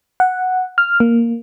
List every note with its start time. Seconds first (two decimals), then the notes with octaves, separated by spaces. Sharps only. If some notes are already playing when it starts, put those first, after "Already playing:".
0.20 F#5
0.78 F6
1.00 A#3